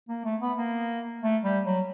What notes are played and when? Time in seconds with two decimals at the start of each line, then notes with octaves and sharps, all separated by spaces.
0.09 A#3
0.25 A3
0.41 B3
0.57 A#3
1.22 A3
1.44 G3
1.65 F#3